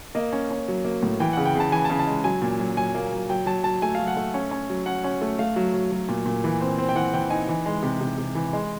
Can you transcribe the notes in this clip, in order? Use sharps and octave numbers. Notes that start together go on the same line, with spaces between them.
A#3 D#5
C#4
C#4
F#3
A#3
A2
E3 G5
F#5
C#3
G5
C#3 A5
E3 G#5
A5
C#3
A5
G#3
F#3 G#5
A#2
F#3
F#3 G#5
A#3
F#3
F#3 G5
F#3 A5
F#3 A5
A3 G#5
F5
F#3
F#5
A3
C#4
C#4
F#3
C#4 F#5
C#4
A3
A3 F5
F#3
F#3
F#3
A#2
A#2
E3
C4
C4
G5
E3 F#5
E3 G5
D#4 G#5
E3
G#3
C3
C3
C3
E3
G#3